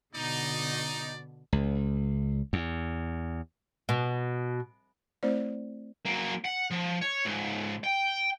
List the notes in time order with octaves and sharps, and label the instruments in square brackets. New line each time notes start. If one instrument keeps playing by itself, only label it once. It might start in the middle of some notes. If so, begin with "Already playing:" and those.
[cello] B2 D3 [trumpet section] D#4 [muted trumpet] D5
[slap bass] C#2
E2
[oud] B2
[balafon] A3 C4 E4 C5 D5
[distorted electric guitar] F#3 A#3
F#5
F3
C#5
C#2 G#2
G5